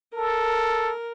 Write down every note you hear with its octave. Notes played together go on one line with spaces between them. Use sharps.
A4 A#4